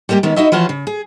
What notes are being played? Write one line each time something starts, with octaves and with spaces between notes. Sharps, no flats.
G3 G#3 A#3 F#4 G4
D#3 G#3 B3 C#4
D#4 E4 F#4 D#5 E5
E3 F3 F4 F#4 C#5
C#3
G#4